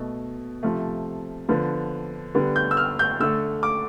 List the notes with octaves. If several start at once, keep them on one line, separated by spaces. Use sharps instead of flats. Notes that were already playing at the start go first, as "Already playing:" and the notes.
Already playing: B2 A3
C3 F3 A3
D3 F3 B3
D3 G3 B3
G6
E6
F6
G6
D3 A3 E6
D6